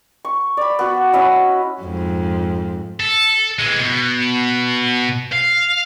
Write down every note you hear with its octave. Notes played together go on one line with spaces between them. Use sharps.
C#6
D5 B5
B3 F#4
C#4 E4 D#5 B5
F2 G#2
A4
E3 G#3
B2
F5